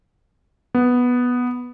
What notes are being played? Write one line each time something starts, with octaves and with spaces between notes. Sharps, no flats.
B3